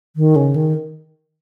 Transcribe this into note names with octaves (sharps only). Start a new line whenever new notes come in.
D#3
C#3
D#3